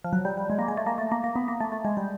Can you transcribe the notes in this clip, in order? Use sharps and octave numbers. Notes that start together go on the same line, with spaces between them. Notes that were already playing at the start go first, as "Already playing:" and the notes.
F3
F#3
G3
G3
G#3
A#3
G#3
A3
A#3
A3
A#3
A#3
B3
A#3
A3
A3
G#3
G3